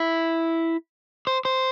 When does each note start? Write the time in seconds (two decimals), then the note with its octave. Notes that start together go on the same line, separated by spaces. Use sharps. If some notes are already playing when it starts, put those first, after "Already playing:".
Already playing: E4
1.27 C5
1.45 C5